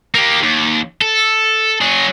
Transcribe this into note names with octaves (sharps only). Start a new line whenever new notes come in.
A#3 G4
D#2
A4
F#3 G#4